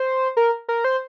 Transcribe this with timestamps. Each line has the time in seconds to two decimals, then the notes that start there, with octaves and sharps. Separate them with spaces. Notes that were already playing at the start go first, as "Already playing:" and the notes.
Already playing: C5
0.37 A#4
0.69 A#4
0.84 C5